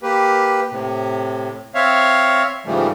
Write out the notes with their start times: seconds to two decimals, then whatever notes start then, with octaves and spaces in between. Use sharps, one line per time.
0.03 A#3 G4 B4
0.71 A2 C3
1.75 C4 C#5 E5 F5
2.66 G#2 C#3 E3 F3 G3 A3